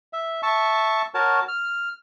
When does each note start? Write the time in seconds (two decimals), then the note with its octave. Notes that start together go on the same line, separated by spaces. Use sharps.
0.13 E5
0.43 E5 A5 C#6
1.14 F#4 A#4 C#5 A5
1.48 F6